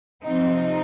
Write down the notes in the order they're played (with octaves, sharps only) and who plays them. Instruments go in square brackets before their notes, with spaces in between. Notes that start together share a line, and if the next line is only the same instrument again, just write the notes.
[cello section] C3 F3 C4 D#4